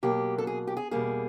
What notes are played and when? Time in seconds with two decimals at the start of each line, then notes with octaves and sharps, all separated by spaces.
0.03 B2 F#3 A#3 G4
0.38 A4
0.47 G#4
0.67 G4
0.77 G#4
0.91 E2 B2 G3 A#3 G#4